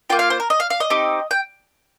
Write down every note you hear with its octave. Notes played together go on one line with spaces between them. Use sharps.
A#3 F4 G5
F5
C5
A#4
D#5
F5
F5
D#5
C4 D#4 G4
G5